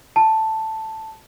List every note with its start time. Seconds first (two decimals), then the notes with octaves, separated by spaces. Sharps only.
0.16 A5